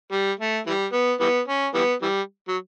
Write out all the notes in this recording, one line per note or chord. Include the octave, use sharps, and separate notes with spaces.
G3
A3
E3 G3
B3
E3 G3 B3
C#4
E3 G3 B3
E3 G3
F#3